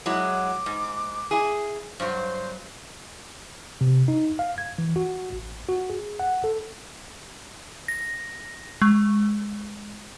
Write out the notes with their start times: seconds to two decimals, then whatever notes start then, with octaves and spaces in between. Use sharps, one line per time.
0.06 F#3 G#3 E4 D6
0.66 G#2
1.31 E4 G#4
2.00 G2 F#3 C5
3.81 C3
4.08 D#4
4.39 F5
4.58 G#6
4.78 E3
4.96 F#4
5.33 A1
5.69 F#4
5.90 G#4
6.20 F#5
6.44 A4
7.88 A#6
8.82 G#3